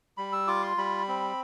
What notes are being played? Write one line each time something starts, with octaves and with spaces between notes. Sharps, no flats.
G3 B5
E6
F4 D6
C6
G3 B5
C4